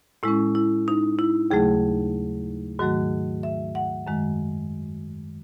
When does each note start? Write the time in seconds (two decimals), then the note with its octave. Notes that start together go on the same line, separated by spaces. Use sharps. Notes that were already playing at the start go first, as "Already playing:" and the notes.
0.23 A2 G#3 C#4 E4
0.55 E4
0.88 D#4
1.19 E4
1.51 D#2 C#3 F#3 A3 G#4
2.79 G#2 D#3 F#3 A3 F#4
3.43 E5
3.75 F#5
4.07 F#2 D#3 G#3